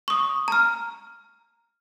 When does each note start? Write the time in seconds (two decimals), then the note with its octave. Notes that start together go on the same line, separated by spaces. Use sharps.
0.08 C#6 D#6
0.48 A#5 F6